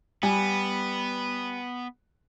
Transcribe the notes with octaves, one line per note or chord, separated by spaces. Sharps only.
G3 B3 G#5